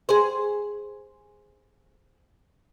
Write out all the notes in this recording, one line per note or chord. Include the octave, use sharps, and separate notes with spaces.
G#4 C5